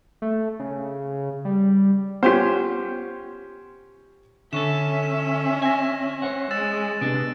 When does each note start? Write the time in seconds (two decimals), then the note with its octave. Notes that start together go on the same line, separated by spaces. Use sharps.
0.22 A3
0.59 C#3
1.45 G3
2.23 B3 C#4 F4 G4 C5
4.53 D3 C#4 A4 E5 C#6 E7
5.03 E7
5.62 G#5 A#6 E7
6.22 C5 C#5 F#5
6.51 G#3 E6 A6 E7
7.01 C3 B3 D4 D7